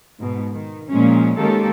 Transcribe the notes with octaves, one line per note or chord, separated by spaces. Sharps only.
G#2 B2
D#3
A#2 F3 G#3 C#4
D#3 G#3 A#3 C#4 G4 A4